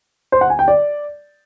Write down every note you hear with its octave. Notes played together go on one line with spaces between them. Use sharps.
C5
F#5
G#5
G5
D5